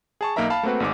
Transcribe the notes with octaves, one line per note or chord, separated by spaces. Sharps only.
G#4 A5 C#6
B1 A#3 D#4 A#4 E5 A#5
F5 A5 B5
A3 A#3 C4 F#4 B4
G#1 G#2 D6